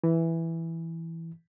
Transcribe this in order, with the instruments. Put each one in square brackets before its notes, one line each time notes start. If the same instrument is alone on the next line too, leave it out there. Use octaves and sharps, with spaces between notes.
[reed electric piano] E3